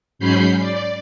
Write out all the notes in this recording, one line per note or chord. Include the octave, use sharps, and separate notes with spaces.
G#2 F#3 C#4 B5 G6 C7
D5